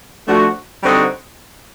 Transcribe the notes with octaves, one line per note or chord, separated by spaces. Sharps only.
F3 A3 D4 F#4
D3 G3 C4 D#4 F#4